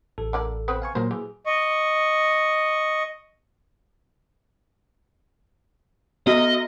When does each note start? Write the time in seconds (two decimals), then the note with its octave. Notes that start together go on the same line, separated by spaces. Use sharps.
0.18 A1 A4
0.33 D3 A#3 D5
0.68 B3 C4 B4
0.82 F5 G#5 C#6
0.95 A#2 F#3 A#3 A#4 C5
1.11 E3 G#4
1.46 D#5 C#6
6.27 B3 F#4 D#5